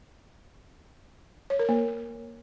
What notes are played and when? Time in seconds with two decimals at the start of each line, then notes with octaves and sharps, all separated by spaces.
1.50 C#5
1.59 A#4
1.69 A#3